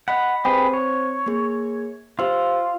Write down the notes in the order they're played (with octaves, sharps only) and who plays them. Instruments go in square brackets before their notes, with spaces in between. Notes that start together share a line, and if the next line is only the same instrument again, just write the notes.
[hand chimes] D#5 B5 B6 [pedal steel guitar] F#5
[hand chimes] C4 C5 [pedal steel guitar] G4 G#4 B4
[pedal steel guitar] C#5
[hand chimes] A#3 G#4
[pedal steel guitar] F4 [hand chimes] G4 C5 E6